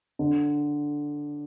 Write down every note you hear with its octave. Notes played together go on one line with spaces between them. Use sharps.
D3